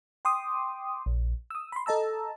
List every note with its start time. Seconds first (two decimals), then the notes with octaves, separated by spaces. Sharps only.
0.25 G5 C6 D6 D#6
1.06 A#1
1.50 D#6 E6
1.72 B5 C6
1.86 A4 D#5 A5 A#5 E6